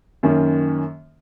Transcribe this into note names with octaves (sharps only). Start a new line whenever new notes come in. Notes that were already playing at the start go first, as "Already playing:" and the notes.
F#2 D#3 A#3 C#4